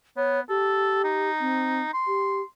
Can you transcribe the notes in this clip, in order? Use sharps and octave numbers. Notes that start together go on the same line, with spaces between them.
B3 C#5
G4 A4
D#4
C4
C6
G4